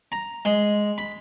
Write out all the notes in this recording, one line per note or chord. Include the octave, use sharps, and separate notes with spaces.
A#5
G#3
B5